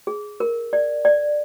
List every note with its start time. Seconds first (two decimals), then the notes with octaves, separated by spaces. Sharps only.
0.07 G#4
0.40 A#4
0.73 D5
1.05 D5